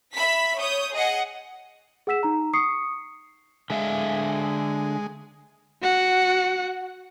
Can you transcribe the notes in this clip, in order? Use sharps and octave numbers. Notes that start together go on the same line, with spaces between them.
E5 B5 B6
C#5 D#6 G6
G#4 D#5 F#5
G#4 F#5 E6 B6 E7
D#4 A#5
C#6 D#6 C7 C#7
D3 G#3 E5 F5
F#4 F#5